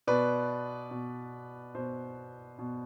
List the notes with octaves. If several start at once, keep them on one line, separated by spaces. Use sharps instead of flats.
B2 B4 D5
B2
B2 C5
B2